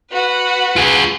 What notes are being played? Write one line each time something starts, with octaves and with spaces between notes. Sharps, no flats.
F#4 B4
F4 G#4